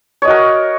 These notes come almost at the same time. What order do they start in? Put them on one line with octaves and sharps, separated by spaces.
C#5 D#5 F#4 A#4